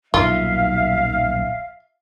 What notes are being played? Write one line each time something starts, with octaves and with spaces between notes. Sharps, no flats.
D#1 B1 D#3 F#3 F4 E5 F5